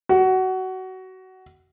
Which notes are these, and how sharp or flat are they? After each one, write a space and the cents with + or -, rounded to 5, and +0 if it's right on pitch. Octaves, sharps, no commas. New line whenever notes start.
F#4 +20